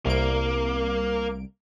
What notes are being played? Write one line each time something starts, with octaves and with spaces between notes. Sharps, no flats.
C2 A#3 D7